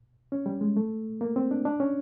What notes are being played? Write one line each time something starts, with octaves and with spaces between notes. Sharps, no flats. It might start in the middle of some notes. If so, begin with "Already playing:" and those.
C#4
G3
G#3
A3
A#3
C4
D4
D4
C#4